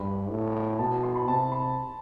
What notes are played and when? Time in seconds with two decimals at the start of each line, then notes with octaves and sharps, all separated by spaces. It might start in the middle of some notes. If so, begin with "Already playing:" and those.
Already playing: G2 B5
0.30 A2
0.79 B2 A5
1.03 C6
1.16 B5
1.28 C3 A5
1.52 B5